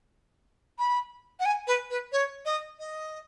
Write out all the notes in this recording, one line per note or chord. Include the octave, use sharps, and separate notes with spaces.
B5
F#5
G#5
B4
B4
C#5
D#5
D#5